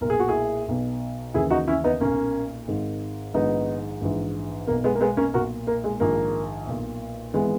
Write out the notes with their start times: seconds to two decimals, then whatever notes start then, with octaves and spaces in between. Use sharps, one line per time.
0.01 B1 A#2 A#4
0.10 G#4
0.20 F#4
0.29 E4 G#4
0.68 B1 B2
1.34 D#2 C#3 E3 E4 G#4
1.50 D#4 F#4
1.67 C#4 E4
1.84 B3 D#4
2.00 B1 A#2 A#3 C#4
2.68 G#1 G#2 D#3
3.34 A#1 G#2 D#3 B3 D#4
4.01 A#1 G#2 E3
4.67 B1 B2 A#3
4.84 G#3 B3
4.95 A#3
5.01 G#3 B3
5.17 A#3 C#4
5.33 B1 A#2 F#4 A#4
5.67 A#3
5.84 G#3
6.00 A#1 G#2 D#3 A#3
6.68 B1 A#2
7.33 G#1 E3 G#3 B3